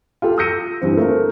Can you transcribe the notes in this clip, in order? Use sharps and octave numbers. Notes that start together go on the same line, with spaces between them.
F4 G4 A4 F5
D#6 E6 G6 A#6 C#7 D#7
G2 E3 C4
A3 A#3 F4 A#4